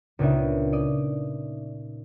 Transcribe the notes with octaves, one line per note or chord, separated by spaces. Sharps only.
C#2 A#2 B3 D4 D#4 E5
D5 D#5